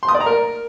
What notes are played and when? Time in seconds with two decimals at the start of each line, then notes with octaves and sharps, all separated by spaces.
0.03 C6
0.09 D#6
0.14 D5
0.20 A#5
0.26 A#4